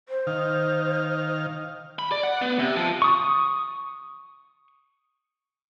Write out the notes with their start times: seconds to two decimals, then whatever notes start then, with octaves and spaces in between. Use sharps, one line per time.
0.09 C5
0.27 D#3 F5
1.99 B5
2.12 D5
2.23 F#5
2.42 B3
2.59 C3
2.76 F3
3.02 C#6 D#6